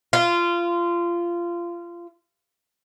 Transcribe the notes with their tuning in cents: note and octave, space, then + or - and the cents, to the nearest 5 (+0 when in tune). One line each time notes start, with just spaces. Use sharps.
F4 -20